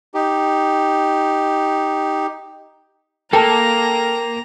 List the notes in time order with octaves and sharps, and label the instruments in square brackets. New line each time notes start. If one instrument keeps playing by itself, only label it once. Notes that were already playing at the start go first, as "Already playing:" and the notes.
[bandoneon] D#4 G4
[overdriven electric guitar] A#3 [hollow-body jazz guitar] A4 [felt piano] G5 A5 [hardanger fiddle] A#5